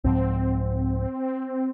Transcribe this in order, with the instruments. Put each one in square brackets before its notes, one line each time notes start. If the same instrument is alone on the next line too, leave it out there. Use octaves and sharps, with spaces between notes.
[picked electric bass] C2 G#2 F3 [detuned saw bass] C4